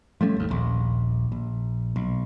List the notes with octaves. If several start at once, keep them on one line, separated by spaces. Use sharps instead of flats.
F3 G3 A3 C#4
G#1 D#2
D#1 A#1
A#1
B1